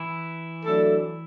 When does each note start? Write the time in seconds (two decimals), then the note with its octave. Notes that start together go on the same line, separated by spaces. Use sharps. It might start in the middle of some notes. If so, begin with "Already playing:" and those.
Already playing: E3 E4
0.65 F#3 A3 D4 A4